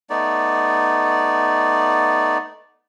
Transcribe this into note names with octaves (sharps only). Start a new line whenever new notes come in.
A3 B3 D#4 D5